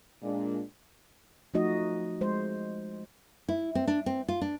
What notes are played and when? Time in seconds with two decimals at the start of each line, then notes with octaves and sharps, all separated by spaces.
0.22 A#2 G#3 D4
1.54 F3 A3 D#4 F#4 D#5
2.21 G#3 C5
3.48 E4
3.75 C4
3.87 D4
4.06 C4
4.28 F4
4.41 D4